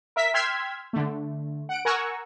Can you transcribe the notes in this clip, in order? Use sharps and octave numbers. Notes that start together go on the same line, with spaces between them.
A#4 E5 B6
G5 C6 E6 F6 G#6 B6
D3 A3
F#5 D7
A#4 F#5 G#5 A#5 C#6 E6